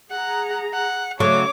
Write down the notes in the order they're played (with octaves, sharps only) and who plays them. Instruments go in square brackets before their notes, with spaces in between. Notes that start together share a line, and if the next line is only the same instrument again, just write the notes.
[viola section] G#4 A#5 [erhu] F#5
[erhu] F#5
[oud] C#3 F#3 A3 [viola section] C#5 [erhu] D6